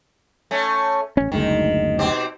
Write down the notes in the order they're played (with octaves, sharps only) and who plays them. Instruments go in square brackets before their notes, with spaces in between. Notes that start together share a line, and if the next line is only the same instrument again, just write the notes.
[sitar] A3 C#4
[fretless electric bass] A1 C#4
[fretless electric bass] F#1 D2 G#3 [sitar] D#3
[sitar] B2 C4 G4